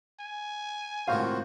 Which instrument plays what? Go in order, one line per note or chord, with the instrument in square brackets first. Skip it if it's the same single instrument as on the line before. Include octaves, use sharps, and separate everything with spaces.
[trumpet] G#5
[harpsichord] C#2 A2 C3 [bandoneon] D#3 F#4 C5 [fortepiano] F5